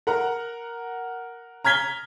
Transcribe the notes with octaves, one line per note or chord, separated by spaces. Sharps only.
A#4 F#5 A#5
A#5 F6 G#6 B6 G7